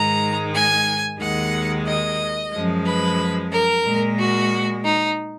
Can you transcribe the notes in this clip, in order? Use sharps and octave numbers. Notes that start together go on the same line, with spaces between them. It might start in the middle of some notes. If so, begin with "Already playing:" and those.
Already playing: G#2 D#3 G#3 A#5
G#5
D#2 D#3 G#3 F#5
D#5
F#2 F3 G#3
B4
A#4
A#2 G#3
F#4
D#4